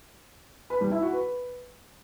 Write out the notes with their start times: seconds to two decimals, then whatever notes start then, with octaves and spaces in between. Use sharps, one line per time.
0.70 B4
0.81 G3
0.91 E4
1.02 F#4
1.13 B4